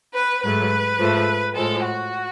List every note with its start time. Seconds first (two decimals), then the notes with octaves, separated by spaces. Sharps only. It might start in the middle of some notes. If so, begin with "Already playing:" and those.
0.14 B4
0.42 G#2 F#3 A3 B4
0.99 G#2 F3 A3
1.55 A2 F3 G#3 A4
1.84 F#4